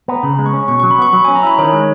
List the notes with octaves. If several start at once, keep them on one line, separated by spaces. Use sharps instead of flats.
B3 A#5
C#3 B5
G#3
C#6
C#4
B2 C#6
F#3 C#6
B5
B3 C#6
F#3 B5
C#4 G#5
A#5
E4 B5
D#3 C#5
G#3